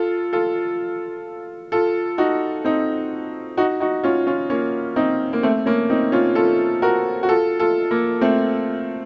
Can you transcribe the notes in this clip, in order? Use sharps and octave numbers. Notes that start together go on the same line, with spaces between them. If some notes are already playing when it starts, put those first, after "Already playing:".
Already playing: F4 A4
F4 A4
F4 A4
D#4 F#4
C4 D#4
D#4 F#4
D#4 F#4
C#4 F4
C#4 F4
A#3 C#4
C4 D#4
A#3
A3 C4
A#3 C#4
C4 D#4
C#4 F4
F4 A4
F#4 A#4
F#4
F4 A4
F4 A4
A#3
A3 C4